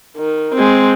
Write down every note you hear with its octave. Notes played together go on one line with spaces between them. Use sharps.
D#3
G#3 C4